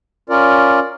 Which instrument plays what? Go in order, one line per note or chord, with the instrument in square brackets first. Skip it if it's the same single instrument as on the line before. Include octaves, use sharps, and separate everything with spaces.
[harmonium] C#4 F4 A#4 D5